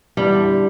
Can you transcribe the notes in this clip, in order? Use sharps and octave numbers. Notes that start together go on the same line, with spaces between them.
E2 G3
D3